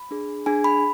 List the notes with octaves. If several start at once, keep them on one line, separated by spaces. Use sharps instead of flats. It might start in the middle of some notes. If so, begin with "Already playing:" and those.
Already playing: B5
D4 G#4
D4 G#4 G#5
B5